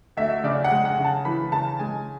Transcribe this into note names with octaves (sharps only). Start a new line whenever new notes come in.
D2 E5
C#3 D5
F#5
G#3
F#5
C#3
A5
E3 B5
C#3 A5
G#3 G#5